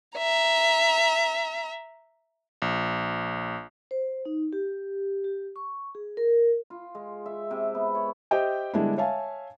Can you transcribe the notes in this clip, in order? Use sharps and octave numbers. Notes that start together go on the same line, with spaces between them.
E5 A#5
A#1
C5
D#4
G4
G4
C#6
G#4
A#4
F4
G#3
E5
C3
B3
C#5
G4 C5 D#5 E5 G5
D3 G3 G#3 B3 D4 E4
C#5 E5 F5 G#5 A5